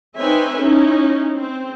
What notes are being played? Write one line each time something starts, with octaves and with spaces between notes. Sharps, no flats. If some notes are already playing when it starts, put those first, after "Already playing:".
C4 D#4 B4 C#5 E5 G#5
C#4 D#4 E4
C4